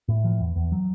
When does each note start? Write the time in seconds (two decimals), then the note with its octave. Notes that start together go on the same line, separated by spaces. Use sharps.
0.08 A2
0.24 F3
0.40 E2
0.56 E2
0.72 F#3